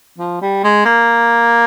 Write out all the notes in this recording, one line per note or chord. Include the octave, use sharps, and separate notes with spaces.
F3
G3
G#3
A#3